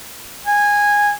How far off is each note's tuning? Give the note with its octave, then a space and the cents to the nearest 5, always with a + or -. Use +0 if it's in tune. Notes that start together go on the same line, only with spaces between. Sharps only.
G#5 -10